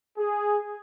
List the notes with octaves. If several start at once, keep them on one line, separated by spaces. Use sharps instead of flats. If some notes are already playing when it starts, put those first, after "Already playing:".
G#4